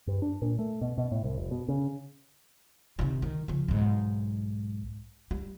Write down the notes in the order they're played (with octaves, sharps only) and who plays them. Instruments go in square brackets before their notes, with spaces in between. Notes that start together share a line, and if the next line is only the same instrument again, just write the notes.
[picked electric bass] G2
D4
A#2
A3
B2
B2
A2
C2
F1
B2
C#3
[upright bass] C3 D#3
D#3
C#3 F3
B1 G#2
G3